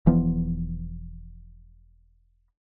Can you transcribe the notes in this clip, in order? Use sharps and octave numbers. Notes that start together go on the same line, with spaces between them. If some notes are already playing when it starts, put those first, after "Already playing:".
E1 E3 F3 B3